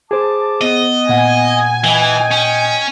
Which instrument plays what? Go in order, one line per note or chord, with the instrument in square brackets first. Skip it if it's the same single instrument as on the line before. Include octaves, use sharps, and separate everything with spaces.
[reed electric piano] G#4 C5 [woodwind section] A5 D6
[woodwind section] B3 [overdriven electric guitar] D#5
[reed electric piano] A#2 F#5 [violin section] G#5
[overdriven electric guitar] E3 [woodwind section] D#5 G5
[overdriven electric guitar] C#4